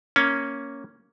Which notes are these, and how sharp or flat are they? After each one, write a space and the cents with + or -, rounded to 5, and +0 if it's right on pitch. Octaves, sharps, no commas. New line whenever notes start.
A#3 +0 C#4 +0